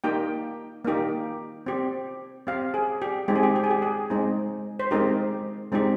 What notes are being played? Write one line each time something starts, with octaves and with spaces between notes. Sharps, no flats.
A#3 D#4 G4 G5
A#3 D#4 G4
C4 G4
C4 G4 F5
G#4
G4
G#3 C4 D#4 G4
G#4
G4
G4
G#4
G4
G#4
G#3 C4 D#4
C5
G#3 C4 D#4 G4 A#4
G#3 C4 D#4 G4